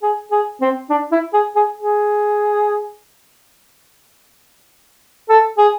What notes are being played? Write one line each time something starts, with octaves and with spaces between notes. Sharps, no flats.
G#4
G#4
C4
D4
E4
G#4
G#4
G#4
A4
G#4